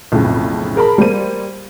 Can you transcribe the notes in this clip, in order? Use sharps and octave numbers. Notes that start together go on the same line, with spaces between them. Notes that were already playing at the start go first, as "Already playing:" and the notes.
B1 F2 A2 C#3
G#4 A#4 A5 B5
G3 A#3 C5 D#7